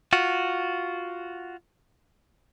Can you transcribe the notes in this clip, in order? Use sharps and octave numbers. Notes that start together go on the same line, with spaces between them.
F4 F#4